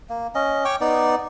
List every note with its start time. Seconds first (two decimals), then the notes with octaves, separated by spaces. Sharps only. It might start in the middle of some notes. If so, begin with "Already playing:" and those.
0.09 A#3
0.35 C#4 D#5
0.65 C#5 G5 C#6 D6
0.81 B3 D#4 D5